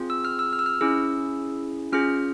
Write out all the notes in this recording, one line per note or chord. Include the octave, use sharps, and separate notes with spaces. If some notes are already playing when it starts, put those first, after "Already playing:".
Already playing: C4 F4 G#4
E6
F6
E6
F6
E6
F6
C#4 E4 G#4 E6
C#4 F4 G#4 F6